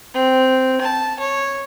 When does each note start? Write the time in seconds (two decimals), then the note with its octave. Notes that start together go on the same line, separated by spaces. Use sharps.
0.14 C4
0.81 A5
1.19 C#5